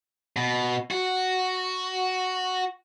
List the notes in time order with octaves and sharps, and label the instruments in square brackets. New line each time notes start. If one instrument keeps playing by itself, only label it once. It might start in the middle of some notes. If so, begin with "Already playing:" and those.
[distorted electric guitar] B2
F#4